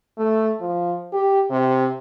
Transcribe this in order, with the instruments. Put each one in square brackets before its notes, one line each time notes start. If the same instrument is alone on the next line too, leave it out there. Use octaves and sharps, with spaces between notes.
[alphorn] A3
F3
G4
C3